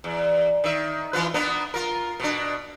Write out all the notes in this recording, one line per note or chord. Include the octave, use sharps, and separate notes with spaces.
E2
D#3 E5
E3 F4 B4
A#3 B3 D4
F4 A#4
B2 D4